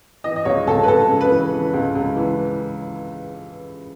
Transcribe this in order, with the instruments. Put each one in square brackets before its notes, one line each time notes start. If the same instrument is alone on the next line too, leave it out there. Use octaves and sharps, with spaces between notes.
[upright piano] E3 D#5
D#5
C#2 C#5
C#2 A4
B4
C#2 A4
C#3
B4
E3
E3
C#2
C#2
E3